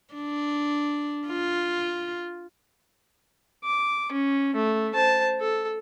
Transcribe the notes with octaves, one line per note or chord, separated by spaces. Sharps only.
D4
F4
D6
C#4
A3
C5 A5
A4